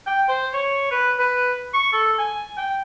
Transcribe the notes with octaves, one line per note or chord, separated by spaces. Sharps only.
G5
C5
C#5
B4
B4
C#6
A4
G#5
G5